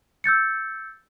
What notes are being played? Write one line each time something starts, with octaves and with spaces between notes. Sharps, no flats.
E6 G6 A6 C#7